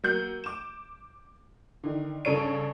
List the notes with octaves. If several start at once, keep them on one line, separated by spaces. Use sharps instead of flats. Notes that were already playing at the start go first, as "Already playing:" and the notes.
F#3 A#3 G6 C#7 F#7
D6 E7
D3 D#3
G2 C#3 A4 C#5 D7